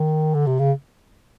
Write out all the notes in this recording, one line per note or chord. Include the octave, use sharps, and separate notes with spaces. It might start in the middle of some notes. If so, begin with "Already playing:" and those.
Already playing: D#3
D3
C3
C#3